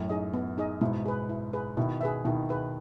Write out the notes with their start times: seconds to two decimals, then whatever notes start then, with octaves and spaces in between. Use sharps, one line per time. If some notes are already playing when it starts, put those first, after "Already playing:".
Already playing: F#2 A2
0.09 D#4 G#4 D#5
0.33 B3
0.58 D#4 G#4 D#5
0.81 G#2 B2 E4
1.06 G#4 B4
1.29 E4
1.53 G#4 B4
1.77 B2 D#3 E4
2.01 G#4 B4 E5
2.25 B2 D#3 E4
2.49 G#4 B4 E5